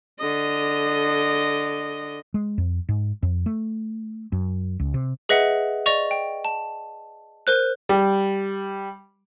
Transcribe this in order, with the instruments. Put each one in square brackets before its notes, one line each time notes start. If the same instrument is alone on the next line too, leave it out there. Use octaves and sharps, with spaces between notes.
[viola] D3 D#5
[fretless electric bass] G#3
F2
G#2
F2
A3
F#2
C#2
C3
[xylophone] G#4 B4 D#5 E5 F#5
D5 D#5 C#6 F7
G5
A5
A#4 C5 F#6
[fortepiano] G3